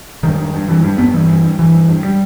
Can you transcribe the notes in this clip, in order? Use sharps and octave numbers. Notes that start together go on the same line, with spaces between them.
G2 D#3
G2
G2
G2 E3
G2 G3
G2 B3
G2 E3
G2
G2
G2 E3
G2
G2
G3